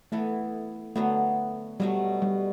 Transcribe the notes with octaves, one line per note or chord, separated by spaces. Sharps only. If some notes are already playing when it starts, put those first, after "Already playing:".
E3 A3 B3 E4 A4
D3 F#3 A3 B3
B2 F#3 G3 A3
G3